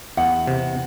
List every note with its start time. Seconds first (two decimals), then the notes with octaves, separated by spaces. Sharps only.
0.17 E2 F#5
0.47 C3